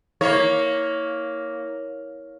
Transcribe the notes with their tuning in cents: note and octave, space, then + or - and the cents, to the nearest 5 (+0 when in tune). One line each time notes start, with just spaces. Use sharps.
A#3 +0 E4 -30 C#5 +0